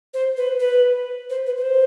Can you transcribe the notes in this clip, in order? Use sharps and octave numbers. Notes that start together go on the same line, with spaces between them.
C5
B4
B4
C5
B4
B4
C5